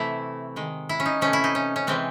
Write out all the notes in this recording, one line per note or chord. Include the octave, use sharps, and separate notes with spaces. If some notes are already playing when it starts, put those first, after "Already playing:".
Already playing: C3 E3 A3 E4
D#3 G#3
E4
C#4
D#4
C3 E3 A3 C#4
E4
D#4
C#4
C#4
C3 E3 G#3 C4